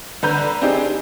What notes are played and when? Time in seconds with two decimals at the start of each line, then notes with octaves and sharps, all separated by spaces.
0.23 D3 B4 A#5 G6
0.61 C4 D4 D#4 G4 G#4